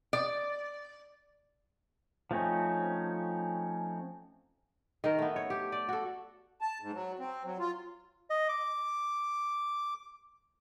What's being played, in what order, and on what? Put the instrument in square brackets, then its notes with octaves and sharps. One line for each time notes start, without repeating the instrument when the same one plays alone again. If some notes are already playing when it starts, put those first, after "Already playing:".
[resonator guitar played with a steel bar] D5
[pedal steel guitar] F3 A3 C4 C#4 D#4
[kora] D#3 A#4
A3 B3
C#5
G4
D5
F#4 A4
[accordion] A5
G#2
F#3
C4
F#3
F4
[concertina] D#5
D6